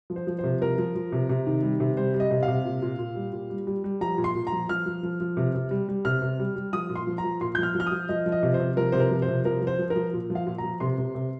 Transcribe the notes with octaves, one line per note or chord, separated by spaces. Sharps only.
F3
C5
F3
C5
C3
F3 A#4
F3
F3
C3
C3
D#3
G3
C3
G3 C5
G3
D#5
C3
F5
C3
A#2
A#2
A#2
G3
A#2
G3
G3
G3
F3 A#5
A#2
C6
A#2
A#5
F3
F3 F6
F3
F3
F3
C3
C3
G3
G3
C3 F6
C3
G3
G3
F3 D#6
A#2
C6
F3
A#5
F3
A#2 C6
F3 G6
F6
F3
F6
D#6
F3
F3 D#5
F3
D#5
C3
C5
C3
F3 A#4
C3 C5
A#4
F3
C5
C3
F3 A#4
F3
C5
F3
A#4
F3
A#2
F3
F5
A#2
A#5
F3
C3 C6
C3
C3